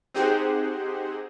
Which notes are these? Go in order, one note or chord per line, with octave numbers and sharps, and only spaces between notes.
C4 D#4 G4 G#4 C5 F#5